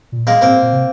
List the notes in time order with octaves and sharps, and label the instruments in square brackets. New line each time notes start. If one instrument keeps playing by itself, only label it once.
[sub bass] A#2
[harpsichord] G#3 A#3
[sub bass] A2 [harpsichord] A#3 C4
[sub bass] A#2
C3